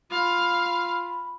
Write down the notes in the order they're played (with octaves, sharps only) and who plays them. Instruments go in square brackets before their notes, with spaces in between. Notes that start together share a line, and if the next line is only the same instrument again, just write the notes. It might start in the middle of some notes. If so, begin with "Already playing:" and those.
[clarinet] F4 [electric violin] F5 [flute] B5